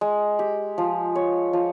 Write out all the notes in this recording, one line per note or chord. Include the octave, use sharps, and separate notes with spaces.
G#3
G4
F3
C#5
F3